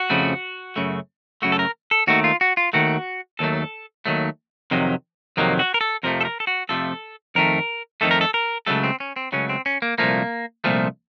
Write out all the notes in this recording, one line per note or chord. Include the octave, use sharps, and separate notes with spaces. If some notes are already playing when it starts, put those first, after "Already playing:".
Already playing: F#4
F2 C#3 F3 A3
F#2 C#3 A3
F#2 C#3 A3 F#4
A4
A#4
A4
D#2 D#3 A3 F#4
F4
F#4
F4
D#2 D#3 A3 F#4
D#2 D#3 F#3 A3 A4
D#2 D#3 F#3 A3
F2 C3 D#3 F#3
F2 C3 D#3 F#3 A#3
F#4
A#4
A4
F2 C3 F3 A3 A#4
A4
A#4
A4
F#4
F2 C3 F3 A3 A4
F2 D#3 A3 A#4
F2 D#3 A3 A4
A#4
A4
A#4
C#2 C#3 F#3 A3 A4
C4
C#4
C4
C#2 C#3 F#3 A3 C#4
C4
C#4
A#3
C2 A#2 F3 A3 A#3
C2 A#2 F3 A3